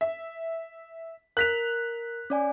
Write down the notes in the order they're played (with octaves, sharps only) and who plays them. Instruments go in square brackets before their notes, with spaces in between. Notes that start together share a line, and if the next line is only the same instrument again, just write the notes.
[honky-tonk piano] E5
[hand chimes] A#4 [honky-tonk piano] F#6 B6 F7
[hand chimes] C#4 D5 G#5